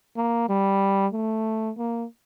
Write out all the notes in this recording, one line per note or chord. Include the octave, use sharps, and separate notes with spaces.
A#3
G3
A3
A#3